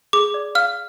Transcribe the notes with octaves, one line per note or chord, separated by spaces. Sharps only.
G#4 D6
D5
F5 F6